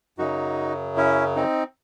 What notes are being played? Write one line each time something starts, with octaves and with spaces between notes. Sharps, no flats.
F#2 C#3 F#3 D#4 F#4
C#4 E4
C4 D#4